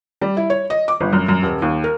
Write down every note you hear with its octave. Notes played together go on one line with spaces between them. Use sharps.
G3
E4
C#5
D#5
D6
G1
F#2
F#2
D#1
D#2
A#4